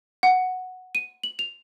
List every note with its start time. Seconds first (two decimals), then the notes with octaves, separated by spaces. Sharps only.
0.23 F#5
0.95 D#7
1.23 F#7
1.39 F7